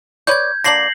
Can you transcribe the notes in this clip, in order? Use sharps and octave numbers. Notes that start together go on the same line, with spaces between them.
B4 C#5 D5 G6 G#6
D3 A#3 D4 A#6 C7 F#7